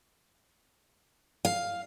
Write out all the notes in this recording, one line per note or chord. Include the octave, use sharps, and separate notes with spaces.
F5